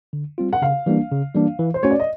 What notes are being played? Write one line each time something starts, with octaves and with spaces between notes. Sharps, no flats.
D3
G3 C4 F4
F#5
C#3 F5
E3 G3 A#3 D4
C#3
E3 G3 A#3 D4
E3
C5
A3 C#4 F#4 C#5
D5
D#5